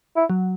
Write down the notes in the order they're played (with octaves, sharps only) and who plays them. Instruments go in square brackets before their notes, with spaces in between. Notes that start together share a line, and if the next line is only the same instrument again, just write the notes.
[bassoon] E4
[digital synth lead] F#3